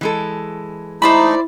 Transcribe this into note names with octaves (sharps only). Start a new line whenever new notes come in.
E3 G#3 A4
A3 D#4 E4 C5 D5 B5